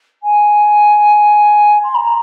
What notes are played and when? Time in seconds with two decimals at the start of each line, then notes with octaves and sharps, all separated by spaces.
0.23 G#5
1.83 C6
1.94 A#5